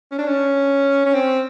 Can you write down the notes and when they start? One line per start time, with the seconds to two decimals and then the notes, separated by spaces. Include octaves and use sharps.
0.12 C#4
0.19 D4
0.27 C#4
1.06 C#4
1.14 C4